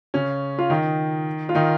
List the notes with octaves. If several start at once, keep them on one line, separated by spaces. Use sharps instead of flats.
C#3 C#4
F4
D#3 D#4
F4
D#3 D#4